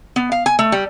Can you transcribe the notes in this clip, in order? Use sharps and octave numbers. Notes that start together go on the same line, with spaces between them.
B3
F5
G#5
A3
G3